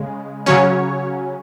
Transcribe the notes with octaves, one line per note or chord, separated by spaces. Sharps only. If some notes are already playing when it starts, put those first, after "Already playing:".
Already playing: C#3 G#3
C#3 F#3 C#4 C#5